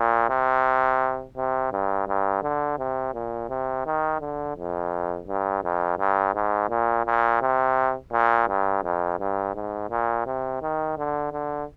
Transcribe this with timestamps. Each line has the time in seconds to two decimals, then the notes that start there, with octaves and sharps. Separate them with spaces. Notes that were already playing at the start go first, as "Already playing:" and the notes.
Already playing: A#2
0.29 C3
1.37 C3
1.72 G2
2.08 G2
2.42 D3
2.78 C3
3.14 A#2
3.49 C3
3.86 D#3
4.21 D3
4.56 F2
5.28 G2
5.64 F2
5.98 G2
6.34 G#2
6.70 A#2
7.06 A#2
7.41 C3
8.12 A#2
8.48 G2
8.84 F2
9.19 G2
9.54 G#2
9.90 A#2
10.26 C3
10.62 D#3
10.97 D3
11.32 D3